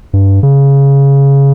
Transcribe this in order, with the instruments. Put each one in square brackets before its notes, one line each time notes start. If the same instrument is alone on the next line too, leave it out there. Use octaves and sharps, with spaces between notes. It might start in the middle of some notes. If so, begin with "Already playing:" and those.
[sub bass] G2
C#3